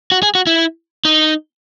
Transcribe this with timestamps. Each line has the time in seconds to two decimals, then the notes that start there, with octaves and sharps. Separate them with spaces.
0.12 F#4
0.23 G#4
0.35 F#4
0.47 E4
1.05 D#4